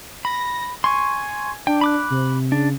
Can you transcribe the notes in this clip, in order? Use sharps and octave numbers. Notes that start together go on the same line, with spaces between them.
B5 A#6
G#5 C6 C#6
D4 G5
B5 D6 F#6
C3
C#3 D4